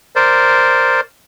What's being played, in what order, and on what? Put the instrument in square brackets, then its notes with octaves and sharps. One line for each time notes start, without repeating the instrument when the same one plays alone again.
[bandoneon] A#4 C5 D5